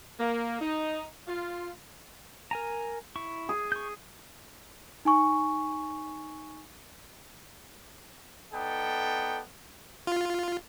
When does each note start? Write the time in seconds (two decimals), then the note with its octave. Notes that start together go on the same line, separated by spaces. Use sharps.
0.20 A#3
0.60 D#4
1.27 F4
2.51 A#4 G#5 A#5
3.16 E4 C#6
3.49 G#4
3.72 C#6 G6
5.05 D#4 G#5 C#6
8.53 B3 D#4 A4 D5 G5
10.07 F4